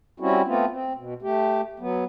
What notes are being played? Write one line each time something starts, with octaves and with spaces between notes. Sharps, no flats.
G3 C4 C#4 E4 F#4
A3 B3 C4 F4
C4
B2
A3 G4
F#3 B3